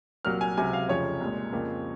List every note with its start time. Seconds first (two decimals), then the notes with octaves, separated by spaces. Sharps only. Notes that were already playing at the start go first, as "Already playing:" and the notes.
0.25 C2 A#2 F#3 A#3 F6
0.41 G#5
0.57 C#2 C3 F#3 G#5
0.73 F5
0.89 F1 F2 C#3 F3 C#5
1.21 C2 A#2 G#3
1.52 F2 C#3 F3 A#3